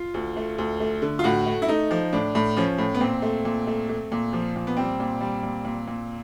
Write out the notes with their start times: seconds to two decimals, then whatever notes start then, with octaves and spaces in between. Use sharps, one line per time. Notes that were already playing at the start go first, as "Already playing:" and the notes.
Already playing: F4
0.14 D2
0.36 A3
0.58 D2
0.80 A3
1.02 D3
1.19 F4
1.24 A2 F#4
1.46 A3
1.62 E4
1.68 A3 D#4
1.91 F3
2.13 A2 D4
2.35 A2
2.57 F3 C#4
2.78 A2
2.94 B3
3.00 A#2 C4
3.22 A3
3.45 A#2
3.67 A3
3.89 A3
4.12 A#2
4.33 F3
4.56 A#2
4.67 B3
4.77 G3 C4
5.00 A#2
5.21 G3
5.43 A#2
5.65 A#2
5.87 A#2